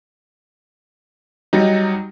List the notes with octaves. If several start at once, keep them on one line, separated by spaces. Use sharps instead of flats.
F#3 G3 D#4